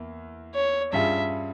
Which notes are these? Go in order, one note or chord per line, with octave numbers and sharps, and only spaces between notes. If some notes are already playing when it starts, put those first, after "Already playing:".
Already playing: E2 A#3 E4
C#5
G2 G3 C#4 F4 G#4 E5